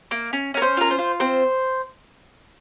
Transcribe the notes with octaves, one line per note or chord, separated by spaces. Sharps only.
A#3
C#4
C#4 A#4
C5
F4 A#4
C5
F4
C4 C5